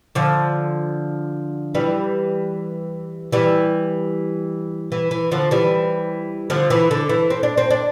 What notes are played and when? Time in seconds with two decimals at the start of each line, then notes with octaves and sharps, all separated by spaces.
0.15 D3 F3
1.75 E3 G3
3.32 E3 G3
4.92 E3
5.11 E3
5.31 D3 F3
5.51 E3 G3
6.50 D3 F3
6.70 E3
6.91 D3
7.09 E3
7.30 C4
7.43 D4
7.58 C4
7.70 D4